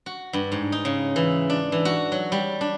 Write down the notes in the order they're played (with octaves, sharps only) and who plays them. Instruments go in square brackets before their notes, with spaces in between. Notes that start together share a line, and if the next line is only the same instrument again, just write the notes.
[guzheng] F#4
G2
G#2
D#4
C#3
E3
D4
E3
F#4
F#3
G3
D4